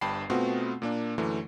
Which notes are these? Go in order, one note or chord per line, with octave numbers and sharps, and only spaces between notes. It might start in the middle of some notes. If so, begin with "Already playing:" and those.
G1 G2 G5 A5 B5 C7
B2 A3 B3 C4 F4 F#4
A#2 A#3 D4
F#2 D3 E3 A3